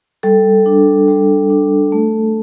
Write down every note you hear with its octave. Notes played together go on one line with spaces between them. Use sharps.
G3 A4
D4
G3
D4
A3